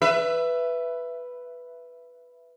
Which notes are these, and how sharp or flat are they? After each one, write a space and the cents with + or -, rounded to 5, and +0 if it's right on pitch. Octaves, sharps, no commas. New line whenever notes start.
B4 +0 E5 +15